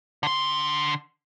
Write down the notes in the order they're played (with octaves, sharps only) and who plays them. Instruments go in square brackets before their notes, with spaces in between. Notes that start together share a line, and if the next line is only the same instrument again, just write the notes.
[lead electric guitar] D3 C6